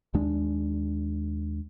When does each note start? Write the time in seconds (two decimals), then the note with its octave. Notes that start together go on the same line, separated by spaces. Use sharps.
0.14 D#2 G#3 D4